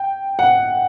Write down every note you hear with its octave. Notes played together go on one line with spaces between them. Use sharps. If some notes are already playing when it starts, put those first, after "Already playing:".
Already playing: G5
F#5